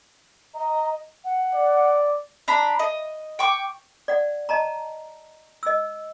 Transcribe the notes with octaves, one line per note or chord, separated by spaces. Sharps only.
D#5 A#5
F#5
D5
D4 A#5 B5
D#5
G5 C#6 D6
D5 F#5
D#5 A5 A#5
D#5 E6